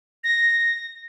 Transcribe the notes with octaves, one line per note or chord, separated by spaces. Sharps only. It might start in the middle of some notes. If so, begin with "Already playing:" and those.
A#6